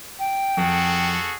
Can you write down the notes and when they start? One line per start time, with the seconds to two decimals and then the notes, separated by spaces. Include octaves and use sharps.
0.19 G5
0.57 F2 F#4 G#4 A4